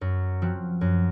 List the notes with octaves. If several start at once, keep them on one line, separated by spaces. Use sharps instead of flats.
F#2
F3 C4 F#4
F#2